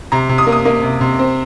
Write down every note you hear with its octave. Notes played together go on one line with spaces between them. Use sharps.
C3 A#5
C3
D#6
A#3
D#6
A#3
C3
C3
C4